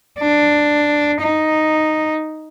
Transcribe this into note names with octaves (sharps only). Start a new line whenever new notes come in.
D4
D#4